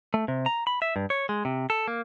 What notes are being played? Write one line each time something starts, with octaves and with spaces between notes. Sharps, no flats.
A3
C3
A#5
B5
E5
G2
C#5
G#3
C3
A4
A#3